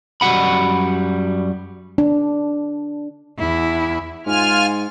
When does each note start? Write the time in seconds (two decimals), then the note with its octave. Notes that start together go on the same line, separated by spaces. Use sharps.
0.21 F#2 G3 F#4 F#5 B5
1.98 D4
3.38 E2 E4
4.26 G#2 F4 G#5 F6